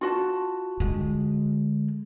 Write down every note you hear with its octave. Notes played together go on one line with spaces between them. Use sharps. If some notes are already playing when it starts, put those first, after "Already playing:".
F4 F#4 A5
D3 G#3